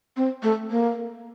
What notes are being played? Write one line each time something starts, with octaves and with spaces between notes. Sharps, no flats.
C4
A3
A#3